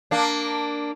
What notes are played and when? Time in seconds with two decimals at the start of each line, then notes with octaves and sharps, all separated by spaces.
0.11 A#3 D4